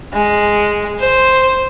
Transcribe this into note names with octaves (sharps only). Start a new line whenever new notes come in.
G#3
C5